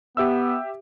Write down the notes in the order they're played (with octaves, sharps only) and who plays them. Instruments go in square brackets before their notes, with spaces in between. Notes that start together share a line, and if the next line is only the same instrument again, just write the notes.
[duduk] B3 [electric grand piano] G4 E5 E6